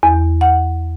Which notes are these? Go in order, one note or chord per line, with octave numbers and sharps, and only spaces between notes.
E2
F#5